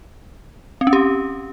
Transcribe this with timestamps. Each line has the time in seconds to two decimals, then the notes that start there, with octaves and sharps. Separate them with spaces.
0.81 C4
0.87 C#4
0.93 G4